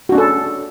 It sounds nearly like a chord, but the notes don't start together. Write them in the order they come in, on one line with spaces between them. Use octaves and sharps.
F#4 D4 C#4 A4